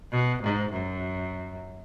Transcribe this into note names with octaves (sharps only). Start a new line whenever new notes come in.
B2
G#2
F#2